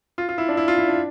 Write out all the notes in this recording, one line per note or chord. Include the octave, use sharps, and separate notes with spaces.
F4
F4
E4
D4
E4
F4
E4
D4